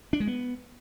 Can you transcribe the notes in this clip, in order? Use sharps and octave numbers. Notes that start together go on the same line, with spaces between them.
D4
G#3
B3